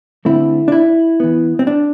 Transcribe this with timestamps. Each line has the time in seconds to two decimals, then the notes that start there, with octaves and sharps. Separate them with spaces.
0.25 D3 A3 C4 E4
0.68 D4
0.72 E4
1.20 E3 B3
1.59 C4
1.67 D4